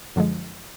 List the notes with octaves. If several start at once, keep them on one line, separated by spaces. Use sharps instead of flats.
F#2 D3 F3 G#3